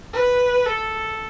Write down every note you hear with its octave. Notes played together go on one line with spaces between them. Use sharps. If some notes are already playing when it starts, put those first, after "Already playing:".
B4
A4